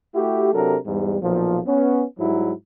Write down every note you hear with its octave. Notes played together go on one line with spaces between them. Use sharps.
A3 E4 F#4 G4
C3 F#3 D4 A4 A#4
E2 G#2 G3
B1 A#2 F3
B3 C#4
G#2 F#3 G3 E4